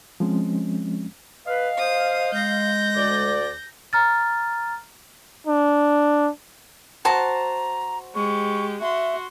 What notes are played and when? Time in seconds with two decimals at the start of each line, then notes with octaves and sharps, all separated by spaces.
0.20 F3 G#3 C4 C#4
1.47 B4 D#5 F5
1.78 C5 D#6
2.33 G#3 G6 A#6
2.96 D2 D5
3.93 A#5 F6 A6
5.47 D4
7.05 F#4 C5 A5 A#5
8.15 G#3 G4 C#6
8.81 F#4 E5 C6